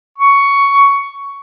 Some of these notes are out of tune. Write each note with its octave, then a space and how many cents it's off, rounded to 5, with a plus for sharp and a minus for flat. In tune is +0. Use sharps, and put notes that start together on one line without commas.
C#6 +10